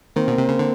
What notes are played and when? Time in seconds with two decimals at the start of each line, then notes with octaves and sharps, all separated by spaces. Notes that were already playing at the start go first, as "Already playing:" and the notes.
0.16 D#3 A#3 C4
0.28 B2
0.38 C3
0.49 C#3
0.59 D3